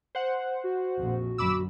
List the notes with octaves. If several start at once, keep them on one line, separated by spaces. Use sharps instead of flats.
C5 F#5
F#4
A#1 F2
F#2 D3 B5 D6 E6